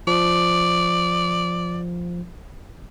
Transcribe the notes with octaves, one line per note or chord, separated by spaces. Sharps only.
F3 D5